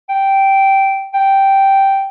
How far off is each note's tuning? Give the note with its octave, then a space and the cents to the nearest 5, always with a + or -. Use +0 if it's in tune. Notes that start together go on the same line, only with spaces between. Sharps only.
G5 -10
G5 -5